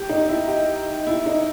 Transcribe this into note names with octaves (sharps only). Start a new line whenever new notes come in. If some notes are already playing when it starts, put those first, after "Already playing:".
Already playing: G4
D#4
E4
G4
E4
D#4